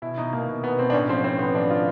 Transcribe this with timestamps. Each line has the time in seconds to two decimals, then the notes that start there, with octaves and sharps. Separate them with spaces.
0.02 B2 E4
0.17 B2 D#4
0.33 B2 A#3
0.48 B2
0.63 B2 B3
0.78 B2 C4
0.90 D4
0.93 A2 C#4
1.09 F3 C4
1.24 A2 C4
1.39 A2 B3
1.54 F3 D4
1.70 A2 F4